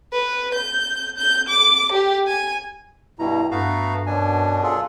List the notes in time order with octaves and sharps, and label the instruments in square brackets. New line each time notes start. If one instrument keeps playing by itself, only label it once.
[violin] B4
G6
G6
D6
G4
G#5
[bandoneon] G2 B2 [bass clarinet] E4 [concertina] A#5
[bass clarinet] G2 [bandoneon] A3 B3 F#4 [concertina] F5 A#5
[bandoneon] F#2 B2 D4 [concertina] G#5
[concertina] F4 G#4 A4